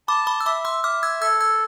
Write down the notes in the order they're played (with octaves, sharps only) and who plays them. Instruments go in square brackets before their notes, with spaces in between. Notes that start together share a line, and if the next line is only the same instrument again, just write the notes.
[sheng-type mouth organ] A5 [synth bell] B5 D6
[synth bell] B5 D6
E6
[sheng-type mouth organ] E5 [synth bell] B5 D6
[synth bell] C6 E6
[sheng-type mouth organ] E5 [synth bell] D6 F6
[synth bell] E6 G#6
[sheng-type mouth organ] A4 [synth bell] E6 G#6
[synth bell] E6 G#6